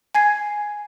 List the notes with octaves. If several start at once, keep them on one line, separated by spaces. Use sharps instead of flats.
G#5 G#6 C7